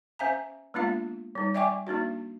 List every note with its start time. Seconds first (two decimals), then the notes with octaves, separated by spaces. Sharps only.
0.19 C#4 C5 E5 F5 G#5 A#5
0.74 G#3 A#3 B3 D4 F4 F5
1.35 G3 D#4
1.54 D5 E5 G5 G#5 C#6 D6
1.87 A#3 D4 D#4 F#4